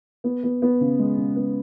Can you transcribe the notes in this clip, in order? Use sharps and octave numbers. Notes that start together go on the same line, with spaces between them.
B3
B3
B3
C#3
G#3
C#3
B3